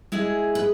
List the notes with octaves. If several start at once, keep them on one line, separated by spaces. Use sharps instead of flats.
G#3 E4 G#4
B4